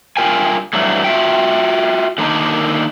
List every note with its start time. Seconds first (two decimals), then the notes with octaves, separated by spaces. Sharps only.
0.17 G2 B3 F4 A#4 G5 G#5
0.73 G2 E3 F#3 A3
1.04 F4 F#4 E5 G5
2.18 D3 D#3 A#3 D4 D#4